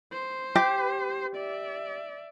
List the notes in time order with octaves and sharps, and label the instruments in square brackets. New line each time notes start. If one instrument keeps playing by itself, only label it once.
[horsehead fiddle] C5
[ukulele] G4
[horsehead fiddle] D5 E5